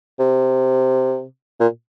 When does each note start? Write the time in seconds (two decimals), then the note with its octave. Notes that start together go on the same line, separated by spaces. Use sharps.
0.20 C3
1.60 A#2